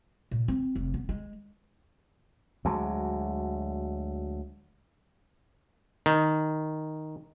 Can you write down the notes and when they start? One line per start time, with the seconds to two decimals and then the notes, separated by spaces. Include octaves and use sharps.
0.31 A#2
0.48 C4
0.76 F1
0.94 B3
1.09 G#3
2.65 D2 F#3 G#3
6.06 D#3